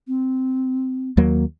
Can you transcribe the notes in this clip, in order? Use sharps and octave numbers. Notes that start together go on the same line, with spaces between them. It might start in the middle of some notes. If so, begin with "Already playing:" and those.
C4
D#2 F#3 A#3